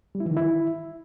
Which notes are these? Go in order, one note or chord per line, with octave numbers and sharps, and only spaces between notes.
G3
E4
E3
D#3
E4